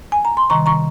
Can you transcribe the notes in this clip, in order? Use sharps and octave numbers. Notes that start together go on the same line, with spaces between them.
G#5
A#5
C6
C3 D#3 G3 A#5 C#6
A#5 C#6